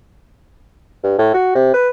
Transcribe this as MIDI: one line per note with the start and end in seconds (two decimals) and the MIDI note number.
1.03 1.14 43
1.18 1.30 45
1.34 1.54 66
1.55 1.72 48
1.74 1.89 71